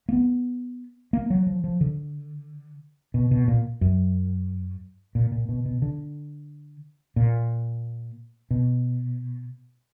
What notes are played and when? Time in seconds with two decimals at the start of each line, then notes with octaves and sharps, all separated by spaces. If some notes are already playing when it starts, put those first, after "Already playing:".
0.09 A#3
0.13 B3
1.13 A#3
1.30 F#3
1.47 F3
1.64 F3
1.81 D3
3.14 B2
3.31 B2
3.48 A#2
3.81 F#2
5.15 A#2
5.32 A#2
5.49 B2
5.66 B2
5.82 D3
7.16 A#2
8.51 B2